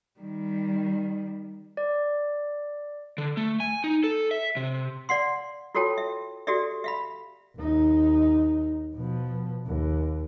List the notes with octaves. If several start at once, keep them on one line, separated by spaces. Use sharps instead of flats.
D#3 G3
D5
D3
A3
G#5
D#4
A4
E5
C3
D5 F5 F#5 C6
F4 F#4 A4 C#5 G5 A5
E5
F#4 G4 A4 D5 E5
E5 F5 B5
D#2 D#4
B2 F3
D#2